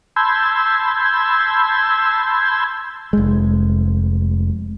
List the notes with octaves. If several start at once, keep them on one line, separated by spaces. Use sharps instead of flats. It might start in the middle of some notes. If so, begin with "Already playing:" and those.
A5 B5 C6 E6 G6 G#6
F1 G#3